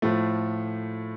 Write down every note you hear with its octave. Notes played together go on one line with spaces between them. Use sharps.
A2 F3 A3